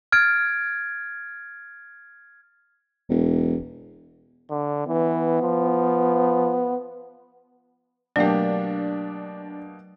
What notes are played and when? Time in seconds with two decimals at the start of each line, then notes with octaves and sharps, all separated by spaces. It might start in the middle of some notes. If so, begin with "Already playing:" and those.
0.12 F6 G#6 A6 D7
3.09 E1
4.50 D3
4.87 E3 B3
5.42 F3
8.16 B2 F#3 A3 A#3 D4 G4